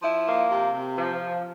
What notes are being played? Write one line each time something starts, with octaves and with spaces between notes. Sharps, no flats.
F3 E4
A#3
C3
C3
F3